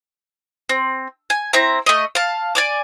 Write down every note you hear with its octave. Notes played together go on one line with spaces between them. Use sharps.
C4
G#5
C4 E4 A#5
A3 D#5
F5 A5
D5 G#5 D6